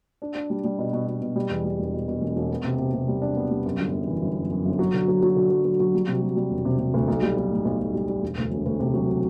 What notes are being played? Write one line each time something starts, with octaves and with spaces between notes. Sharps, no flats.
D4
D4
G3
G3
B2
B2
B2
B2
G3
E2
G3
E1
B2
B2
E1
E1
B3
C3
C3
C3
G3
D4
B3
G3
F#2
G1
F#2
E3
G1
F#2
F#2
G1
F#3
D3
F#3
F#3
D3
F#3
F#3
F#3
G3
C3
G3
G3
E1
C3
C3
D2
B1
G3
B1
A2
B1
B1
G3
G3
E1
D2
E1
D2
C3
F#3